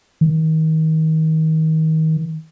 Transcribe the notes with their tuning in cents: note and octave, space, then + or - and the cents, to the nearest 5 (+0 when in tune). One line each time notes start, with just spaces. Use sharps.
D#3 +30